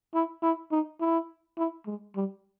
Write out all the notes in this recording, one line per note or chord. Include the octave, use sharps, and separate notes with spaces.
E4
E4
D#4
E4
E4
G#3
G3